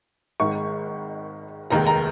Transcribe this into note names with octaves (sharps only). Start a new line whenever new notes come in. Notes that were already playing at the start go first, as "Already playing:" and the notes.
G#1 G#2 D#3 G#3 C#6
F1 D#2 D#3 G#3 A#5
A#5